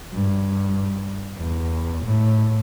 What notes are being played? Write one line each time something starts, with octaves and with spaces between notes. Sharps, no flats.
G2
E2
A2